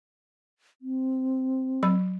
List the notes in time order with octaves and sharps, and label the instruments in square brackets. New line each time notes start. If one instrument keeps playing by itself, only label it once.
[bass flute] C4
[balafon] F#3 B5